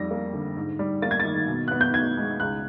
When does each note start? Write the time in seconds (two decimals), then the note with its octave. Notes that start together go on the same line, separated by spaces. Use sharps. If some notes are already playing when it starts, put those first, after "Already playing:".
Already playing: F2 G3 A#6
0.11 A#3
0.34 D3
0.57 G#2
0.79 G3
1.02 A#3 A6
1.11 G#6
1.20 A6
1.25 D#3
1.48 B2
1.68 B3 F#6
1.81 G6
1.94 B2 G#6
2.17 G#3
2.40 C#2 F#6